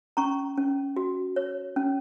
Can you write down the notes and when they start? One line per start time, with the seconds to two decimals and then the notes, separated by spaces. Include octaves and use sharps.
0.17 C#4 A#5 C#6
0.57 C#4
0.97 F#4
1.36 C#5
1.76 C#4